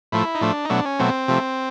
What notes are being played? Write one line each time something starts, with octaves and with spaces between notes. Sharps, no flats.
A2 F3 A3 E4
D#4
A2 F3 A3 D4
D#4
B2 F#3 A3 D4
C#4
B2 F#3 A3 C4
C3 F3 A3